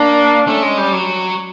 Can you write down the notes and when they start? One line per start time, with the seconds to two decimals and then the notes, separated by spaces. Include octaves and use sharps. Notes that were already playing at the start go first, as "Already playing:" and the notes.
Already playing: A#3 D4
0.47 A3 C#4
0.63 G#3
0.77 G3
0.93 F#3